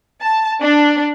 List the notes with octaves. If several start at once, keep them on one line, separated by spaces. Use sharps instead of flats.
A5
D4